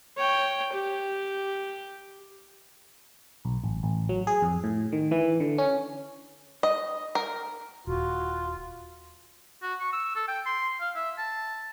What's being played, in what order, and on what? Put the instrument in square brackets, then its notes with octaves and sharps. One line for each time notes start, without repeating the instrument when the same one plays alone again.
[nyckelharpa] C#5 G5
G4
[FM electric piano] B1
A1
A1
F#3
G#4
F2
A2
D#3
E3
D3
C#4
[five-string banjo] D#5
A#4
[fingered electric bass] D#1 [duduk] F4 [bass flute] F#4
[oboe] F#4
C#6
E6
A4
G5
C6
F5
E5
A5